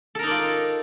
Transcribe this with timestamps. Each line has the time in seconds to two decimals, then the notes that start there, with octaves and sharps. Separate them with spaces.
0.15 A4
0.19 A#4
0.23 D#4
0.27 D5
0.31 F4